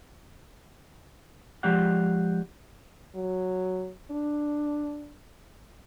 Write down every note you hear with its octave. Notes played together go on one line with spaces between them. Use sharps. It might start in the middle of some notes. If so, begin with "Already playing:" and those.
F3 G#3 G4 D5 F5 F#5
F#3
D4